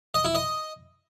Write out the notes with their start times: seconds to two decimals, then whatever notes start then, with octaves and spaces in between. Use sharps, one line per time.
0.14 D#5
0.25 E4
0.35 D#5